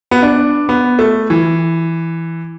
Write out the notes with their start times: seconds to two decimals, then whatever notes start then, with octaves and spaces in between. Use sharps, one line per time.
0.11 B3
0.22 D4
0.69 B3
0.99 A3
1.30 E3